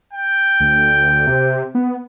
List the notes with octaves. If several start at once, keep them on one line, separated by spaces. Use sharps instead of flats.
G5
D2
C3
B3